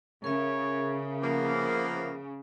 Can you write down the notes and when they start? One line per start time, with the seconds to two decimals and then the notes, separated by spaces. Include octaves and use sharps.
0.24 C#3 A#4 C#5 E5
1.22 F3 A#3 B3